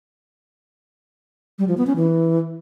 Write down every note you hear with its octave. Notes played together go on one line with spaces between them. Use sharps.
G3
F3
B3
C#4
E3